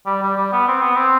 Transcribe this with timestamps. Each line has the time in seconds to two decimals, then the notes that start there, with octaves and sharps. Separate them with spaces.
0.06 G3
0.22 G3
0.37 G3
0.52 B3
0.68 C4
0.81 B3
0.96 C4